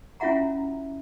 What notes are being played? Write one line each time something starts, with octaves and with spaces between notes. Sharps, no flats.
C#4 E4 F4 E5 F#5 A#5